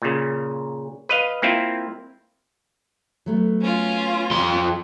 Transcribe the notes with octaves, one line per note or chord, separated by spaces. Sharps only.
A#2 C#3
B4 D#5 F5
A#3 C4 E4 F4
F#3 A3 B3
C#4 F4
F2 C6